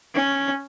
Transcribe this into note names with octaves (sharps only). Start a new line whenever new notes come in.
C#4